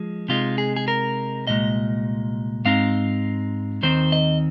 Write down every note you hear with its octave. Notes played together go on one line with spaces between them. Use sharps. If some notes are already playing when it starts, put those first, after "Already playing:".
Already playing: F3 G#3
C3 G#3 D#4 F4
G#4
G#4
A#4
C2 A#2 G#3 D#5
G#2 G#3 C4 D#4 F5
D#2 D#3 C4 D#4 C5
D#5